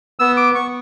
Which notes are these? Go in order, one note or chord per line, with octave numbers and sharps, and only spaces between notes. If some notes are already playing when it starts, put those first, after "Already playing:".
B3 E6
D6
B3 C#6